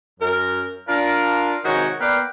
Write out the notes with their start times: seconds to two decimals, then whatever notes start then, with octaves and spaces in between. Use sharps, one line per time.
0.20 F#2 A#4
0.88 D4 F4 A#4
1.65 G#2 C3 D#3 F#4 C#5
2.00 A#3 B3 B4 D5 F5 G5